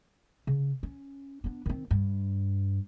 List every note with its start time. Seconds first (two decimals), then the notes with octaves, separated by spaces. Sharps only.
0.47 C#3
0.83 C#4
1.44 B3 D4
1.66 D#3 C4
1.91 G2